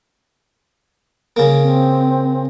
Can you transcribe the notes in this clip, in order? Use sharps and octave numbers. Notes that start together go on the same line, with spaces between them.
C#3 A#3
C4